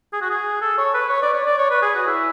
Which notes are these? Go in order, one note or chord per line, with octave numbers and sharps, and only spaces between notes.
G#4
F#4
G#4
A4
C#5
B4
C#5
D5
C#5
D5
C#5
B4
G#4
F#4
E4